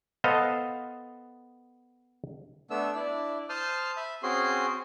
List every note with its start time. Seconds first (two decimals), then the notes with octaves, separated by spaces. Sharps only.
0.24 B3 A4 C5 D#5 F5
2.70 A3 B3 D4 E6
2.95 D4 E4 D5
3.49 C5 A5 C6 D#6 F6
3.97 E5 B5
4.23 C4 C#4 F#4 G#4 C6